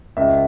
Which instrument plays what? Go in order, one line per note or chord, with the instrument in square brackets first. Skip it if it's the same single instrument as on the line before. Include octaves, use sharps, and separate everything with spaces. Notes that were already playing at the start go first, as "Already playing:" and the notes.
[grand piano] C#2 E5